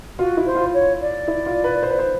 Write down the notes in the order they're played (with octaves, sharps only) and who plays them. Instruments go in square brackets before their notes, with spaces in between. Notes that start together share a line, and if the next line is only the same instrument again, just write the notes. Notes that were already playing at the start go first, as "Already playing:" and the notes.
[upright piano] F4 [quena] F#4
[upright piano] E4
[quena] C5
[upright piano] F4
[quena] C#5
D5
[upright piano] E4
F4
B4
C5
B4
C5